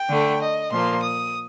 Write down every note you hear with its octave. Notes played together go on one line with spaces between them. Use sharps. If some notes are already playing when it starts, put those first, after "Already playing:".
Already playing: G5
D3 A3
D#5
A#2 F3 A#3 C6
D#6